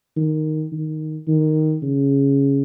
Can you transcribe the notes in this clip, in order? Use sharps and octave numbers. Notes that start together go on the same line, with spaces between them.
D#3
D#3
D#3
C#3